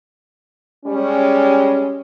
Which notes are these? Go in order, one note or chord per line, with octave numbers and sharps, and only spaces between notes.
G3 G#3 C#4